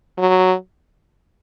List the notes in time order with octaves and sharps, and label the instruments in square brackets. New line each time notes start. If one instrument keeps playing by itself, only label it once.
[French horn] F#3